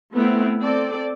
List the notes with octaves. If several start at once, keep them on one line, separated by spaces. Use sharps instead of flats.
A3 B3 C4 E4
C4 A4 D5